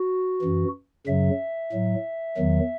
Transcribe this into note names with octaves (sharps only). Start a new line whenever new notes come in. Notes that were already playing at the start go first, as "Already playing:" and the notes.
Already playing: F#4
F#2 E3
F#2 C#3 F#3 E5
A2 F#3
E2 D#3 F#3